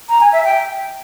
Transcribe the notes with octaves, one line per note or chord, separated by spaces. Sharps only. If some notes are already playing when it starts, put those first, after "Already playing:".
A#5
G#5
E5
G5